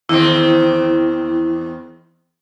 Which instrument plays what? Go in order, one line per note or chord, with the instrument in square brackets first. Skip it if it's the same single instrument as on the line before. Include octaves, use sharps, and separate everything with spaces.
[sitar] E2 D#3 C4 [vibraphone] E4